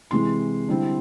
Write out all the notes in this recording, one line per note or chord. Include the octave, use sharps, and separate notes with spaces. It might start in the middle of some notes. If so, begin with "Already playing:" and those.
C3 E3 G#3 C6
D3 G3 C4 E4